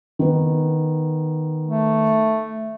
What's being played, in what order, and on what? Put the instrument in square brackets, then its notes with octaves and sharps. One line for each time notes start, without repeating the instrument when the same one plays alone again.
[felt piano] D#3 B3
[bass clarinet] A3